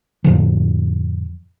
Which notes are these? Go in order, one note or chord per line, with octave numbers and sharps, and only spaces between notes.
F2 A2 D3 F3